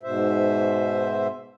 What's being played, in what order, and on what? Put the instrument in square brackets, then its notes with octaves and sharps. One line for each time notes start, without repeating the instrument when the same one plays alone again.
[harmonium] G#2 B2 C5 E5